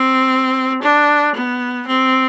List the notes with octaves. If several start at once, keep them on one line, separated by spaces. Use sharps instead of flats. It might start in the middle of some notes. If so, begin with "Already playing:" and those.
Already playing: C4
D4
B3
C4